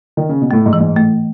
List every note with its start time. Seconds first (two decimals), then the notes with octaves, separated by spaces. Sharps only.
0.17 D#3
0.29 C#3
0.41 B2
0.51 A2 A3
0.66 G#2
0.73 E3
0.80 G#2
0.96 A2 A3